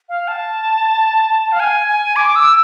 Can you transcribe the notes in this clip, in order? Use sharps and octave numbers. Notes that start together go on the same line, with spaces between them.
F5
A5
F5
G#5
G#5
D6
E6